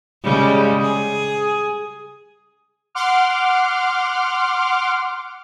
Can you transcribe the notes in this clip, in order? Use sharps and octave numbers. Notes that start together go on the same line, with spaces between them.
C#3 G3 G#3
G#4
F#5 C6 D6 F6